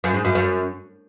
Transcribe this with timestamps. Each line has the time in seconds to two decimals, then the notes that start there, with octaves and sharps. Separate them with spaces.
0.04 F#2
0.14 G#2
0.25 F#2
0.35 F#2